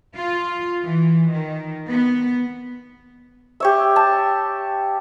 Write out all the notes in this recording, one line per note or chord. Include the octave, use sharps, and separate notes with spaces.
F4
E3
D#3
B3
G4 C#5 E5
A5